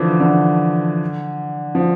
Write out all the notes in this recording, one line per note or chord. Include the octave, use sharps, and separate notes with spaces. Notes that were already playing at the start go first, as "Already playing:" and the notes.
Already playing: D3 E3 F3
D3
F3